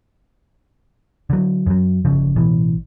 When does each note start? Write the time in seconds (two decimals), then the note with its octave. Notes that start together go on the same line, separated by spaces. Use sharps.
1.30 D3 F#3
1.67 F#2 F#3
2.05 G1 C#3 F3
2.36 A1 B2 E3